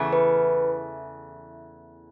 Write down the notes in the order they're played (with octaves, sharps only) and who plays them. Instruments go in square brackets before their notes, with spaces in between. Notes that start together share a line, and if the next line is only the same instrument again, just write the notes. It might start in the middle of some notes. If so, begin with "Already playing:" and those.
Already playing: [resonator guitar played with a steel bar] E2 C#3 E3 A3
[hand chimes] B4